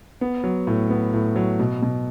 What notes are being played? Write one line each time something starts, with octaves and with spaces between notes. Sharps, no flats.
B3
F#3
A2
B3
A2
F#3
B2
B2